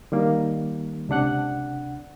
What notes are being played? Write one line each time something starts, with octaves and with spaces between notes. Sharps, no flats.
D#3 G3 A#3
C#2 C3 D4 F#5 F#6